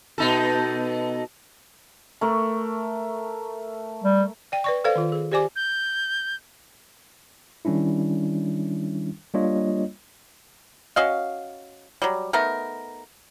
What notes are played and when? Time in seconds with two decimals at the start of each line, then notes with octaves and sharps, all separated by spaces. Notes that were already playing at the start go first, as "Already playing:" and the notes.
0.18 B2 D#4 A4
2.21 A3 A#4 C#6
4.04 G3
4.52 D5 G5
4.64 B4 D5 C#6
4.84 A4 B4 C5 D5 F5
4.96 D#3 F4
5.12 G#4
5.32 G4 C5 D5 G#5 D6
5.56 G6
7.65 D#3 G3 C#4 D4 E4
9.34 G3 A#3 D4 F4 C#5 D#5
10.96 C#4 F#4 D#5 F5
12.02 F#3 G3
12.33 A3 B3 D#4 A#4